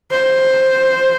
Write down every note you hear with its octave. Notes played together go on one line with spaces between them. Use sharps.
C5